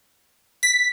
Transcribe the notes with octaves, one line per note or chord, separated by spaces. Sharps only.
B6